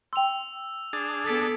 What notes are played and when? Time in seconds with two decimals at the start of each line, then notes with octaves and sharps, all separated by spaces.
0.13 G5 C6 E6 F7
0.93 D4 G#4 A5
1.25 B3 A4 D#6 B6 D7